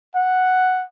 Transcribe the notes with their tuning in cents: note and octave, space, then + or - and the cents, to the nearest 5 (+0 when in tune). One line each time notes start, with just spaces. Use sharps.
F#5 +0